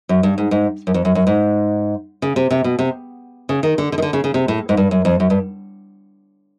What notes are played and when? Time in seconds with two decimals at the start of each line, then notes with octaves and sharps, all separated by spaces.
0.09 F#2
0.23 G2
0.38 G#2
0.51 G#2
0.87 F#2
0.94 F2
1.05 F#2
1.15 F#2
1.27 G#2
2.22 C#3
2.36 C3
2.50 C3
2.64 B2
2.79 C3
3.49 C#3
3.63 D#3
3.78 D3
3.92 D3
3.98 D#3
4.02 D3
4.13 C#3
4.24 C#3
4.34 C3
4.48 A2
4.69 G#2
4.77 G2
4.91 F#2
5.05 F2
5.20 F#2
5.30 G2